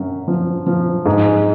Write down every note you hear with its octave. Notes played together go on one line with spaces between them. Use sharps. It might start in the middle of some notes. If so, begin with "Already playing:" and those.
Already playing: F#2
F3
F3
G#2